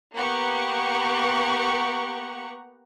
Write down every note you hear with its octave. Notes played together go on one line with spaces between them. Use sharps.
A#3 B3 G4 F#5 A#5 C#6